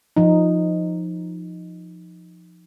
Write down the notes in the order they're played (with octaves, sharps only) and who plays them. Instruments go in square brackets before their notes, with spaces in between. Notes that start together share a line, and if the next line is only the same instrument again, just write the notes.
[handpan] F3 D#4